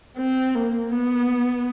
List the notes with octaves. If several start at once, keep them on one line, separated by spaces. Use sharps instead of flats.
C4
A#3
B3